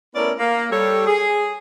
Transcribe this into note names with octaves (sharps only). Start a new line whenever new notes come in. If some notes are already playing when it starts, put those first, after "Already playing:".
A3 B3 C#4 E4 A#4 D5
A#3
G3 A4 C#5
G#4